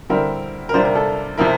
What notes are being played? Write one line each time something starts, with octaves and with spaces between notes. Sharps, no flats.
D3 G3 C4 E4 A#4
A#4
C3 G3 D4 F4 C5
A#4
A4
C3 F3 C4 E4 A#4